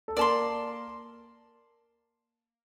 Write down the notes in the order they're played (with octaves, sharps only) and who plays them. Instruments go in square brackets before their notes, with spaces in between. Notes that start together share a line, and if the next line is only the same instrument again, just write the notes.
[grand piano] A4
[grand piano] A#3 A#4 [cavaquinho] D5 A5 C6